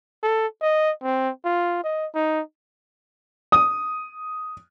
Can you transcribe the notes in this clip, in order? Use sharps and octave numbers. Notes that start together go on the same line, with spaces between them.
A4
D#5
C4
F4
D#5
D#4
D#6